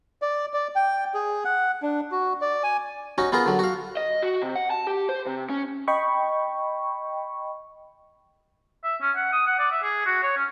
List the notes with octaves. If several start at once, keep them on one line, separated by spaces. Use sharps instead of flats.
D5
D5
G5
G#4
F#5
D4
F#4
D5
G#5
C#4 D#4 F#4
B3 F4 G#4 A#4
D3 F#3
F#4 F5
D#5
F#4
C3
F#5
A5
G4
C5
C3
C#4
D#5 G5 B5 C#6
E5
C#4
F#5
D#6
F#5
D5
E5
G#4
F#4
C#5
C#4